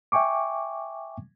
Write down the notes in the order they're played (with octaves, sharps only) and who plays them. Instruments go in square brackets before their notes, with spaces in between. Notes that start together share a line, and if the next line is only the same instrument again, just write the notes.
[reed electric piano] E5 G5 G#5 C#6 D6